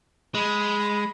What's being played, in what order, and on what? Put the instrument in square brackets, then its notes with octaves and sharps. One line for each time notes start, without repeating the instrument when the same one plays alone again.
[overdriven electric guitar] G#3 [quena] B5